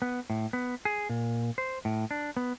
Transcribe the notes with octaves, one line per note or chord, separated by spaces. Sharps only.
B3
A2
B3
G#4
A#2
C5
A2
D4
B3